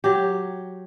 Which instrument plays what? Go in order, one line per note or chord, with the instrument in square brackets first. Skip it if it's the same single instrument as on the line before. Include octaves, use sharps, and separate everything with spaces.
[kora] F#3 G4